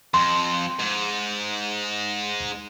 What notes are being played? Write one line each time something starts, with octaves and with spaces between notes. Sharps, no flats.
F2 C6
G#2